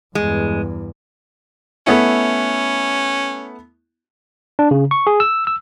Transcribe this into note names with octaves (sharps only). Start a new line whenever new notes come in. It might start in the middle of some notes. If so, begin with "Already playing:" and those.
E2 G2 G#3
A3 B3 C#4 E4
D4
C#3
C#6
G#4
E6
E6